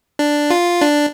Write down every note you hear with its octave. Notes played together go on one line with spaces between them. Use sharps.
D4
F4
D4